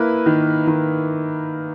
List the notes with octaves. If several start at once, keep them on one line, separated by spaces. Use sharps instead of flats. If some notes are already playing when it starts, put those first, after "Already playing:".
Already playing: A#3 E4 B4
D#3
D#3